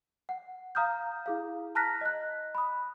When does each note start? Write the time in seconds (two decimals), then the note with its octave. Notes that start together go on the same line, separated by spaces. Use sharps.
0.29 F#5
0.75 F5 A#5 D#6 F6 G6
1.26 E4 G#4 F5
1.75 A5 A#5 F6 F#6 A#6 B6
2.01 D#5 F#6
2.55 B5 D#6